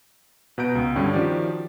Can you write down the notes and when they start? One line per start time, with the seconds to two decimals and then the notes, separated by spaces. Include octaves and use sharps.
0.58 B2 B4 F#5 A#5 G6 D7
0.75 C#2 B2
0.96 G2 D3 C#4 G5
1.13 D#3 F3 C#4 F#4 G4 D5